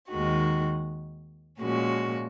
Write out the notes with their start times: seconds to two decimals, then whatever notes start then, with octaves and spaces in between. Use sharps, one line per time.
0.10 D#2 D#3 G#3 D#4 F#4
1.60 A#2 F3 G#3 C#4 F#4